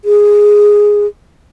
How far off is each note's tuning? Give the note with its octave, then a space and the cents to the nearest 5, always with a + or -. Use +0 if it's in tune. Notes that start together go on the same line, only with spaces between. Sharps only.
G#4 -5